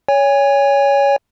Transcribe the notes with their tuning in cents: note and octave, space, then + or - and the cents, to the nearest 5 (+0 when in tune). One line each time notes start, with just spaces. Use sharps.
C#5 +20 G#5 -30